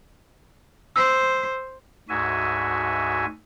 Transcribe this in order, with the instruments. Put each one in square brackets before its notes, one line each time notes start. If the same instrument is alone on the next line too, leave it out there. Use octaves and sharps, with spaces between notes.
[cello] C5 [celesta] E6
[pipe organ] D2 G#2 F#4 E5 G#5